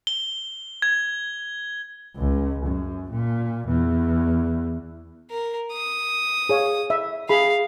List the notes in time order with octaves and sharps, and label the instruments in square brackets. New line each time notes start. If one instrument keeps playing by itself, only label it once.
[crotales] G7
G#6
[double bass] C#2
F#2
A#2
E2
[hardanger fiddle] A#4
D#6
[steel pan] G#4 C#5 F5
E5
[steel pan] G#4 B5 [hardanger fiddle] F5